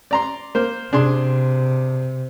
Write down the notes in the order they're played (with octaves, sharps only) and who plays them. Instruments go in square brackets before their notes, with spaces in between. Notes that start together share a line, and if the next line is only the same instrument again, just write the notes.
[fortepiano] D5 A#5 C6
A#3 C5
[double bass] C3 [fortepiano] D4 G#4 C6